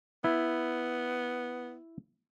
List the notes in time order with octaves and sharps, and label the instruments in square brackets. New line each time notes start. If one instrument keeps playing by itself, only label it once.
[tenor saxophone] B3 [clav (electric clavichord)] E4